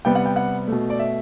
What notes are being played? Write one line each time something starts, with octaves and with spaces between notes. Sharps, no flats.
C3 G3 B3 G5
F#5
G5
F#5
B2 A3
D5
E5